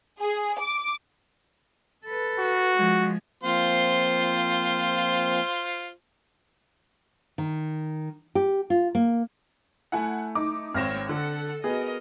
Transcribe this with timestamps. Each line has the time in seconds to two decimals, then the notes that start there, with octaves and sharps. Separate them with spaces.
0.20 G#4
0.58 D6
2.06 A4 B4
2.40 F#4
2.76 F3 G#3
3.43 F3 A#3 C4 F4 C5
7.38 D#3
8.35 G4
8.70 F4
8.95 A#3
9.92 A3 E4 F#5 G#5
10.35 D#4 D6
10.74 G#1 C4 B4 C#5 F6 A#6 E7
11.09 D3 A4 F#5
11.64 B3 F#4 G#4 A#4 D#5